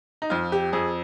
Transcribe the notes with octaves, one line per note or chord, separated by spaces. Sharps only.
D#4
F2 F4
G4
F2 G#4